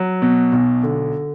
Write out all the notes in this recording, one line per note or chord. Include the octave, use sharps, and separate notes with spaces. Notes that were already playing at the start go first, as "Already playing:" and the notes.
Already playing: F#3
B2
B1
D3